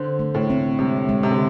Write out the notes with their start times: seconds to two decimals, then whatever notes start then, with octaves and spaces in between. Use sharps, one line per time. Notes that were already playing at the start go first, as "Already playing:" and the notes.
Already playing: D3 C5
0.19 A3
0.34 A2
0.50 C4
0.79 C3 G#3
1.09 G#3
1.23 C3
1.31 D3